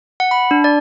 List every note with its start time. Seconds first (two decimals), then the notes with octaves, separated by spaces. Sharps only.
0.20 F#5
0.31 B5
0.51 D4
0.64 D5